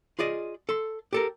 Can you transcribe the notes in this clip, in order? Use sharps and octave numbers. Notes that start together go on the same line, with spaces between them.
F4 G#4 D5 D#5
A4 C6
G4 A4 A#4